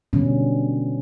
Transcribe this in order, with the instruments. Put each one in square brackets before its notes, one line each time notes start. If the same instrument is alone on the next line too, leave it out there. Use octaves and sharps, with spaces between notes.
[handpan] B2 D3 G3 C#4